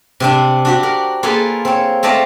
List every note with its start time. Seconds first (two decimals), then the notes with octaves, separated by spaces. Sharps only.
0.20 C3 C4 D4
0.65 D4 F#4 G4
0.83 A#4
1.23 A#3 F4 G#4 A4 B4
1.65 C4 C#5
2.03 A3 C4 A4 D5 D#5 F5